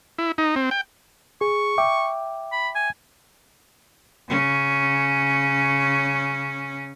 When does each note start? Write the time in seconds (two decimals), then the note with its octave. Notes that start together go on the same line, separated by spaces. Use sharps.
0.19 E4
0.38 D#4
0.56 C4
0.71 G5
1.41 G#4 C#6
1.78 E5 G5 D6
2.52 B5
2.75 G#5
4.28 C#3 C#4